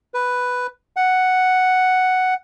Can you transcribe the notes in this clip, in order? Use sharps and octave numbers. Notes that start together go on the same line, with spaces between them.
B4
F#5